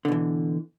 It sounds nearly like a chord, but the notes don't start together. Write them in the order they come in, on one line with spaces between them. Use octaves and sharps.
D3 B2 E3